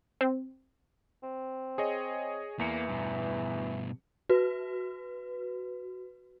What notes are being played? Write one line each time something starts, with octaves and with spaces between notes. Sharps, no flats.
C4
C4
G#4 C#5 D#5
E2 E3 A#3 C#7
G2 B2
F#4 B4